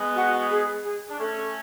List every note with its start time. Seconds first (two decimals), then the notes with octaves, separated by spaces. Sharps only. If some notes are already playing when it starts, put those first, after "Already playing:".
Already playing: G#3 B3
0.15 F#4
0.50 G#4
0.84 G#4
1.09 D4
1.19 A3 C#4 A4